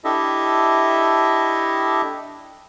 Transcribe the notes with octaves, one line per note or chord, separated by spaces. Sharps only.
D4 E4 G4 A4 D#5 E5